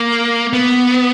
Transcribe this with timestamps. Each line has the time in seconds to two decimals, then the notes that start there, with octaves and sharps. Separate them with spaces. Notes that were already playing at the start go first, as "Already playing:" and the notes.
Already playing: A#3
0.53 B3